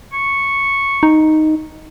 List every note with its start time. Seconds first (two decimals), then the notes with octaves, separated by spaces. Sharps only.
0.13 C#6
1.03 D#4